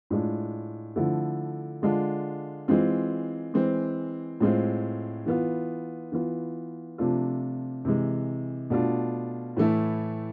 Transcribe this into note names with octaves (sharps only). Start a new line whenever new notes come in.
A2 G#3 D4 F4
D3 F3 A3 E4
D3 G#3 D4 F4
E3 G#3 C4 F4
E3 G#3 C4
A2 G#3 C4 F4
E3 B3 F4
E3 B3 F4
C3 F3 A3 D4 F4
C3 E3 G#3
B2 A3 D4 F4
A2 E3 A3 E4